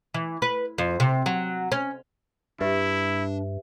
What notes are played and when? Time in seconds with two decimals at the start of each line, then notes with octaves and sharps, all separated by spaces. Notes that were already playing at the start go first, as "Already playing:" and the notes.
0.14 E3
0.42 B4
0.78 F2
1.00 C3
1.26 F#3
1.72 C#4
2.61 G2 D4 E4 G4 B4 E5